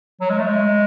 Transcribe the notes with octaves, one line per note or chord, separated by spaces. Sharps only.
F#3
G#3
A3
G#3